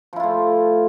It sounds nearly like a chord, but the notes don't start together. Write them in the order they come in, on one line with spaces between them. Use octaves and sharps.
F3 E4 F4 A3